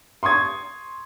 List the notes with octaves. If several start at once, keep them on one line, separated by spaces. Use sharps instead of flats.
C6 C#6 D#6 G#6